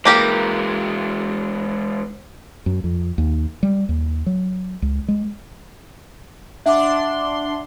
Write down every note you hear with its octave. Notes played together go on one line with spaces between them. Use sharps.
E3 G#3 A#3 G4 A#4
F#2
F2
D#2
G3
D#2
F#3
C#2
G#3
D4 E5 F#5 C6 D6